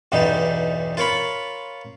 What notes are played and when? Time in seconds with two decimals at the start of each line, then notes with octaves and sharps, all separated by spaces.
0.12 B1 E2 G2 G3 D#4
0.97 F4 A#4 C#5 B5